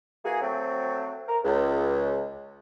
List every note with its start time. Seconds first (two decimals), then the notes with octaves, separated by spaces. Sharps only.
0.24 E3 A#3 F#4 G#4
0.42 F#3 A3 C4
1.28 A#4
1.44 C#2